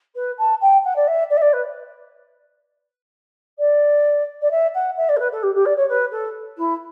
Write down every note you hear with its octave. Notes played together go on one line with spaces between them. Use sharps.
B4
A5
G5
F#5
D5
E5
D5
E5
D5
B4
D5
D5
E5
F#5
E5
D5
A4
B4
A4
G4
G4
D5
C#5
B4
A4
E4